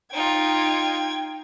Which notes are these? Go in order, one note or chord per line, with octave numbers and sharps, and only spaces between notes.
D#4 F4 G5 G#6